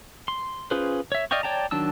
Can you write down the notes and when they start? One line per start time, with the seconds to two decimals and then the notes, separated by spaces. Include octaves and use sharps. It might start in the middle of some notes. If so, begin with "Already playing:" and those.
0.28 C6
0.71 C#4 F4 G#4 B4 C5
1.12 C#5 E5
1.31 D5 D#5 F5 G5 C#6
1.43 C#5 D5 G5 A5 A#5
1.71 D#3 F#3 D4 A5 E6